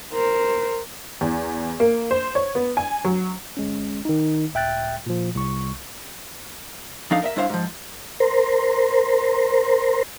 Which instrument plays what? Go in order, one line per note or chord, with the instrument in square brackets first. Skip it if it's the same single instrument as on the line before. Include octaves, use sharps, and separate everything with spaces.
[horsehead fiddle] A#4 C5
[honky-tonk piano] E2
A#3
C5
C#5
B3
G#5
F#3
[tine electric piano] G1 G#3 C#4
D#3 D#4
C#2 A2 E5 G5 F#6 A6
A#2 F3
C2 C#6
[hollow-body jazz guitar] F3 D4 D#4 A4 F5
A#4 D#5 E5
G2 D4 E4 C5 E5 F5
G#2 F3
[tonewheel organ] A#4 C5